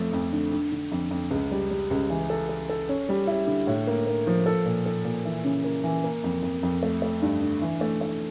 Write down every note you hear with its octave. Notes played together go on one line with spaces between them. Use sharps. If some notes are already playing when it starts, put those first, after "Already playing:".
Already playing: F2 F3 A3
F2
D3
D3
D3
F2
F2
C#2
G3
G3
C#2
E3
A4
A4
A4
C#4
G3
E4
D3
A2
A#3
A#3
F3
A4
A#2
A4
A#2
E3
C#3
A#3
E3
A#3
F2
F2
F2
A3
A3
G2
D3
E3
A3
A3